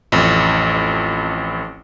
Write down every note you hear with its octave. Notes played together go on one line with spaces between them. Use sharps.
A1 F2